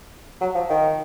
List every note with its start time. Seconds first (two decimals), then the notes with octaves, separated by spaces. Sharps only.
0.41 F#3
0.55 F3
0.69 D#3